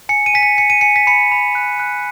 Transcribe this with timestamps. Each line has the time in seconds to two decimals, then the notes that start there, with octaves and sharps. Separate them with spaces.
0.09 G#5 C#7
0.26 D#7
0.34 G#5 B6
0.43 C#7
0.58 G#5 C#7
0.70 D#7
0.81 G#5 C#7
0.96 B6
1.07 B5 C#7
1.32 B5
1.55 F#6
1.80 F#6